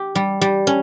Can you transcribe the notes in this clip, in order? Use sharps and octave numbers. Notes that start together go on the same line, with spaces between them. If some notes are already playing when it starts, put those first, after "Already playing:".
Already playing: G4
G3
G3
C#4